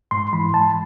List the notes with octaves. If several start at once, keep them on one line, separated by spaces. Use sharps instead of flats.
G#2 C6
E3 B5
G#2 A5